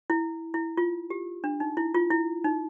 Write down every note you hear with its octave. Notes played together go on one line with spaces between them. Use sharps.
E4
E4
F4
G4
D4
D#4
E4
F4
E4
D#4